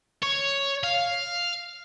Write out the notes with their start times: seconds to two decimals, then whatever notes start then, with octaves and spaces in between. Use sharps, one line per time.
0.23 C#5
0.84 F5